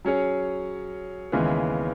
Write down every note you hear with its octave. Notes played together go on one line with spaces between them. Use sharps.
F#3 C#4 G#4 C#5
D#2 C#3 E3 G#3 B3